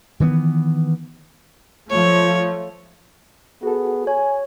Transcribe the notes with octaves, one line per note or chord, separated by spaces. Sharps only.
D#3 E3 G3 B3
F3 A3 C#5
B3 F#4 G#4 A4
C#5 G#5